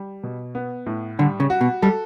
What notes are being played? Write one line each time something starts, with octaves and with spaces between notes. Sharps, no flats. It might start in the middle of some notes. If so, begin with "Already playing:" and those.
Already playing: G3
B2
B3
A2
D3 G3
C#3
F#4
B2
G3 A4